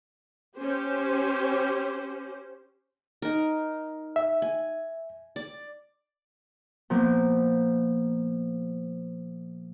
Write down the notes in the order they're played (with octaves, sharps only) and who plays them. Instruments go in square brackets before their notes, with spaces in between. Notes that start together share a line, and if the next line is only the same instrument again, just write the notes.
[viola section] C#4 G4 C5
[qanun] D#4 A#4
[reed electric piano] E5
[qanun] G#5
D5
[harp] A#2 F3 B3